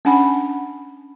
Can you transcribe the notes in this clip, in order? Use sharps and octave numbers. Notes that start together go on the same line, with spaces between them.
C#4 D4 F#5 G#5 B5